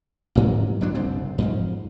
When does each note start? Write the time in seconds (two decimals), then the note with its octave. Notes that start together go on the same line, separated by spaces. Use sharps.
0.35 A1 G#2 F#3
0.81 G1 F2 F#3 D4
0.95 F#1 C2 G#2 C4
1.38 F2 G#2 F3